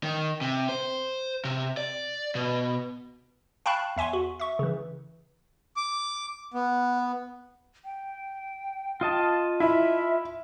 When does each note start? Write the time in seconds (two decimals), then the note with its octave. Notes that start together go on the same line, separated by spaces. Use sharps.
0.03 D#3
0.41 C3
0.69 C5
1.45 C3
1.77 D5
2.35 B2
3.66 F5 G5 A5 B5 C#6 F#6
3.97 E2 E5 G#5 C6 C#6
4.13 F#4
4.40 E5 C#6
4.59 C#3 E3
5.77 D6
6.54 B3
7.85 G5
9.01 F4 D#5 A5
9.60 E4 E5